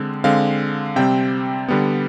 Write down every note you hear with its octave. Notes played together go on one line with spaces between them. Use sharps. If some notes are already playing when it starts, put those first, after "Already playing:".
Already playing: D3 G#3 C4
D3 G#3 C4 F5
C3 G3 C4 G5
D3 G3 B3